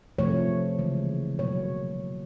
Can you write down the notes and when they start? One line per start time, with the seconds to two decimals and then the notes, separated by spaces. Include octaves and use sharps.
0.19 C3 F3 A3 C#5
0.79 C#3 E3 G#3
1.38 B2 F#3 A#3 C#5